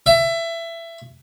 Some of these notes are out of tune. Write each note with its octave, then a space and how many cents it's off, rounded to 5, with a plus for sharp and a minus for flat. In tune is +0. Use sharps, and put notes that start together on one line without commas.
E5 +20